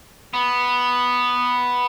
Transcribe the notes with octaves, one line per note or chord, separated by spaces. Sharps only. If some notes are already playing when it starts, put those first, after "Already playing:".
B3